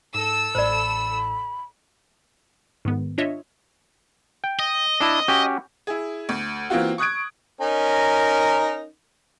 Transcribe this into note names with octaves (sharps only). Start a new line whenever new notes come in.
G#2 A4 E6 A#6
A1 A2 C5 D5 B5
G#2 D#3 B3
D4 F4 C#5 D#5 E5
G5
D#5
D4 E4 A5
C#4 F#4 G4
E4 G#4
D2
E3 A#3 C4 F4 F#4
C#6 D#6 F#6 G#6 D7
C#4 D#4 A#4